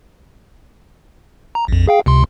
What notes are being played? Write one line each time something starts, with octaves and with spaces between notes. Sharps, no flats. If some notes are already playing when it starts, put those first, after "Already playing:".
A#5
A#1 F2
G#4 F5 G5
C#2 C3 C6